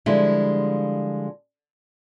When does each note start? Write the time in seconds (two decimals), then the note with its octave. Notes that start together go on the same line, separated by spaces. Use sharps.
0.06 D3 F3 G3 G#3 E4 F4